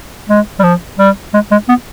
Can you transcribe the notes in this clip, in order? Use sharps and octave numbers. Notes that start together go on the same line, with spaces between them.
G#3
G3
F3
G3
G#3
G#3
B3